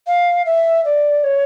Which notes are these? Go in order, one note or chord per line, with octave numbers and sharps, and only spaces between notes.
F5
E5
D5
C#5